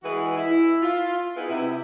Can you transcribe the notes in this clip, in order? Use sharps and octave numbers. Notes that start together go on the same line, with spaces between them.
E3 G#3 F#4 G#4 B4
E4
F4
B3 D#4 E4 G#4 B4
C3 E4